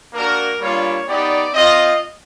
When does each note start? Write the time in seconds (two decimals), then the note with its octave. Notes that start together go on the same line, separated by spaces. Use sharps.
0.14 A#3 D4 F#4 A#4
0.60 G3 A#3 D4 F4 C#5
1.06 B3 D#4 G4 D5
1.53 C4 F4 D#5